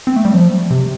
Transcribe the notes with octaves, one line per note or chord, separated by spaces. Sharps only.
C4
A3
G3
F3
C3